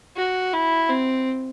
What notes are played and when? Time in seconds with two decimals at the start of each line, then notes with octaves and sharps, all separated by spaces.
0.17 F#4
0.53 E4
0.89 C4